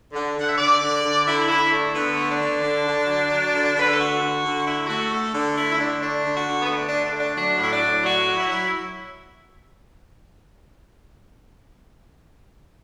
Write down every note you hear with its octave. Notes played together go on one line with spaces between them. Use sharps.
D3
D3 F#5
E5
D3 D5
D3
D3
D3 E4
D3 E4
A3 D4
D3 B3
A3
D4
D3
D3
D3
F#3
F#3
D3
D3 B4
A4
A3 F#4
D3
D3
A3 E4
A3 F#4
D3 A4
D3 D4
A3 E4
E4
D3 D4
A3 D4
D3
F#4
D3
B3
A3 D4
D4
D3
D4
A3
D4
F#3 D4
A2 E4
D4
A2
F#3 F#4
F#3
E4
F#3